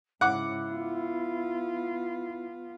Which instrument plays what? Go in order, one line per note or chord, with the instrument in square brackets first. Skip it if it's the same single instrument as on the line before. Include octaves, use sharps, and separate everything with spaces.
[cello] G#2 C#3 [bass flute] E4 [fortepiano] F#5 D6
[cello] B3 F4